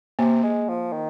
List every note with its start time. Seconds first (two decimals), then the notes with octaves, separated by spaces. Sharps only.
0.19 C3 A#3
0.44 G#3
0.68 F3
0.92 D#3